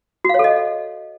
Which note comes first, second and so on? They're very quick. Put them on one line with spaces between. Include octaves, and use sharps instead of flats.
F#4 F5 C#5 A4 D#5